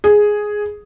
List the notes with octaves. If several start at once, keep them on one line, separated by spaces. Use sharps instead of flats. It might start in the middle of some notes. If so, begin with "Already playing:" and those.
G#4